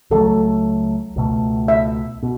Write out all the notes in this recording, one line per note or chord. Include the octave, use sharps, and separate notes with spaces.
C#2 C#3 F#3 A3 A4
C#2 B2 A3
E5
B2